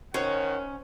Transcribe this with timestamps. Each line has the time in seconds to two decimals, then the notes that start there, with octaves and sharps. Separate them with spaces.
0.14 D#3 C#4 C5 C#5 F#5